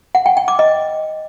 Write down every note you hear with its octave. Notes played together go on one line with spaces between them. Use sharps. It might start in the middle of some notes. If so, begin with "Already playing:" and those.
F#5
G5
G5
D6
D#5